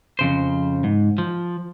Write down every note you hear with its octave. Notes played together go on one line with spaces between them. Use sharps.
F2 C#3 C5
G#2
F3